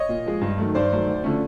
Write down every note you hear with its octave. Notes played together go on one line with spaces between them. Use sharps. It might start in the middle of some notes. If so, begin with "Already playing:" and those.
Already playing: C#5 D#5
A#2
F3 G#3
G2
D#3 F#3 A3
G2 C5 D5
D#3 F#3 A3
D2
D3 F3 A3 C#4